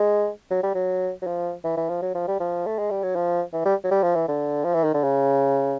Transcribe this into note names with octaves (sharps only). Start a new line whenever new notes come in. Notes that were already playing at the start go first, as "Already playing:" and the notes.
Already playing: G#3
F#3
G3
F#3
F#3
F3
E3
E3
F3
F#3
F3
G3
F3
A3
G#3
G3
F#3
F3
E3
G3
F#3
G3
F3
E3
D3
F3
E3
D#3
D3
C#3